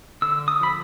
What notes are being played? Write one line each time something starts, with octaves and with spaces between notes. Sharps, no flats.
D3 E6
D#6
F3 B5